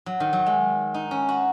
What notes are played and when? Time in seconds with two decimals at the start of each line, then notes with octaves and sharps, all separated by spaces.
0.06 F#3
0.20 D#3
0.33 F#3
0.46 G#3
0.94 D#4
1.11 C#4
1.29 F#4